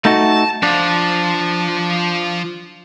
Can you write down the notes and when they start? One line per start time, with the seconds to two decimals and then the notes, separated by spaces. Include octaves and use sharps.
0.05 A3 D#4 F#4 A5
0.63 F3 D4